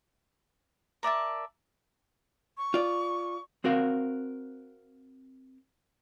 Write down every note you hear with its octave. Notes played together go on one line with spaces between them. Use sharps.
A#4 D5 E5 A5
C#6
F4 D5
C4 F#4 A#4 F5